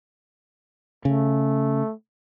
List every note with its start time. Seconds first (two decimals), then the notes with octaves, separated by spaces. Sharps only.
1.05 C#3 A3